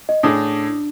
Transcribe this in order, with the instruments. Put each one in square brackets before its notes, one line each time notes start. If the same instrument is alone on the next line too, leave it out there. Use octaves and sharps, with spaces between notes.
[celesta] D#5
[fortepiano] A2 G#4 [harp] D4 [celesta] D#6